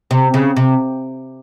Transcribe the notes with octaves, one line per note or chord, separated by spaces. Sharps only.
C3
C#3
C3